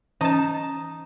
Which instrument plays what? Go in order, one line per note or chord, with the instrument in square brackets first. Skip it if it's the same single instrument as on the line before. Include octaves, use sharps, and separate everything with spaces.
[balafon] E3 C#4 [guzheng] D#4 A5